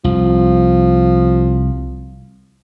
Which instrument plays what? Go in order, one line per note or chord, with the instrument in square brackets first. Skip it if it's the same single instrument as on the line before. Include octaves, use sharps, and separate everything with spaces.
[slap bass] C2 [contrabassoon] F3